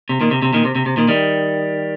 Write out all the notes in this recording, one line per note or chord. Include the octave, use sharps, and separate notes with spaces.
C3
A#2 D#3
C3
C3
A#2 D#3
C3
C3
C3
A#2 D#3
D#3 G3